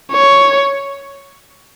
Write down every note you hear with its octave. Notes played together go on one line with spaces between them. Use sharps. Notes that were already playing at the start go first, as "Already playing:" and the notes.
C#5